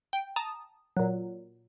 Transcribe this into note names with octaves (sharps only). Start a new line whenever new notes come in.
G5
A5 A#5 D#6
A#2 F#3